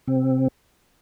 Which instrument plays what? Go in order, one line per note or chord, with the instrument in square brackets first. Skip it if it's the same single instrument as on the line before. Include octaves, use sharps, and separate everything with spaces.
[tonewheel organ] C3 C4